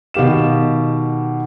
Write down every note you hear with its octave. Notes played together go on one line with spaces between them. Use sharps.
B2 D#3 G4 F5 E7